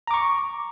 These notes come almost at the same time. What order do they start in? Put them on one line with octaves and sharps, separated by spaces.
A#5 D6 C#6